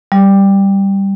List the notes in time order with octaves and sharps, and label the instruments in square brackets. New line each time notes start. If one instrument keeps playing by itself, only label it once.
[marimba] G3